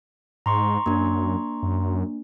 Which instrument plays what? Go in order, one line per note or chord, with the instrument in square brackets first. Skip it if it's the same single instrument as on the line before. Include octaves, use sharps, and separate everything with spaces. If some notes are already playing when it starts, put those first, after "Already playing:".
[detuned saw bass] G#2 [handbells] A#5 C6 C#6
[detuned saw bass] F#2 [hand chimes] A#3 D4
[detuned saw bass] F#2